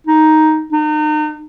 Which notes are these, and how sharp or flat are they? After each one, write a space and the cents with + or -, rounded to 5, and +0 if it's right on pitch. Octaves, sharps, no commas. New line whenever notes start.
D#4 +5
D#4 -35